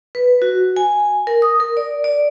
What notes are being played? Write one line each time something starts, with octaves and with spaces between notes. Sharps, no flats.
B4
F#4
G#5
A#4
D#6
A#4
D5
D5